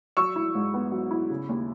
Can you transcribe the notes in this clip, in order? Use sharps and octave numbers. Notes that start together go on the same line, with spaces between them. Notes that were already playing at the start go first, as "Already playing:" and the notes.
F#3 C#6 E6
E4
G#2
B3
F#3
E4
C#3
D#2